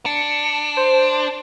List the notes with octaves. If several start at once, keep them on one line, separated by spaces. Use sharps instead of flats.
D4 C#7
C5